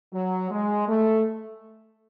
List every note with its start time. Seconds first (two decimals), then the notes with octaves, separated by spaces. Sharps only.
0.13 F#3
0.51 G#3
0.88 A3